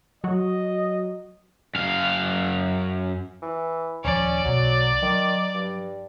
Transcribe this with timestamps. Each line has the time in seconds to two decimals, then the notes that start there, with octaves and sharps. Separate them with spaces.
0.24 F#3 F#4 D#5
1.75 F#2 F5
3.42 E3
4.04 D#1 D#2 F3 C#4 D5
4.45 B1 B2 F#3
5.02 D#3 F#3
5.55 G2